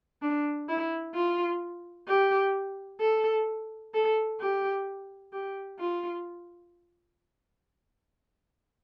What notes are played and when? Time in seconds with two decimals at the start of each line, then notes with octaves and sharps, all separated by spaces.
0.22 D4
0.69 E4
1.14 F4
2.08 G4
3.00 A4
3.94 A4
4.40 G4
5.33 G4
5.79 F4